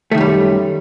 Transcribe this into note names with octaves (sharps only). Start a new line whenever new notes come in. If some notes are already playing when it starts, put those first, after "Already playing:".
F#2 D#3 G3 A3